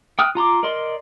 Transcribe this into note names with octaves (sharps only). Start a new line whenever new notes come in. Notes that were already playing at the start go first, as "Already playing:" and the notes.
G5 D#6 F6 F#6
F4 A#5 C6 D6
A#4 D5 D#5 C6